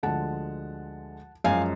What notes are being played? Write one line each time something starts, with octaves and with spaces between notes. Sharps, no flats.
D2 D3 F3 G#3 F#5 A5
F#2 F3 G#3 F5 G#5